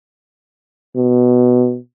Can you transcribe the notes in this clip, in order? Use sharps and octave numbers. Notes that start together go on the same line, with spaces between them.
B2